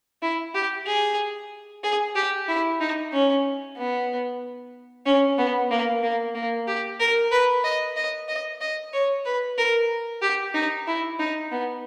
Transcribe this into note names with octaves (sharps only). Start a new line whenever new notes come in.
E4
G4
G#4
G#4
G4
E4
D#4
C#4
B3
C#4
B3
A#3
A#3
A#3
G4
A#4
B4
D#5
D#5
D#5
D#5
C#5
B4
A#4
G4
D#4
E4
D#4
B3